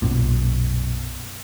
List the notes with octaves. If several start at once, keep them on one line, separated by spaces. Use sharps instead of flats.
B1 F#2 A#2